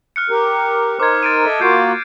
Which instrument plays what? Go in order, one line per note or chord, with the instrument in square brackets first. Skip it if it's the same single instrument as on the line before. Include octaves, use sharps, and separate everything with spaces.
[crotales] F6 F#6 C#7
[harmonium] G4 A#4
[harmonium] D#4 A#4 C5 [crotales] D6 G#6
[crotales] A6 D7 D#7
[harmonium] A4 D#5 E5
[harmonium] A#3 F4 F#4 [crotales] G6 C7 D7